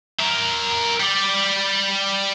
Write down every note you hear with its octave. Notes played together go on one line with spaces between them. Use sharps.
A#4 E5
G3 D5